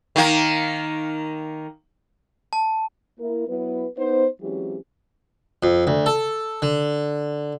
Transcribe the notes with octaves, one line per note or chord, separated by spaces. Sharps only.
D#3 A#3
A5
A#3 E4 A#4
F#3 B3 E4 B4
B3 D#4 C5
E3 F#3 G#3 C4 C#4 G4
F2
D2
A4
D3